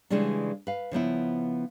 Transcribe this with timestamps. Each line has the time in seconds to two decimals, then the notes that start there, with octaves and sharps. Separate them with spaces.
0.10 C#3 E3 G3 G#3 C#4 D4
0.67 B4 F5
0.91 C#3 F3 B3 E4